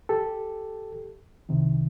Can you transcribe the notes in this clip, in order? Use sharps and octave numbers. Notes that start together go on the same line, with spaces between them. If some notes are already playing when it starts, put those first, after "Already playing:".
G4 A4
C2 C3 D#3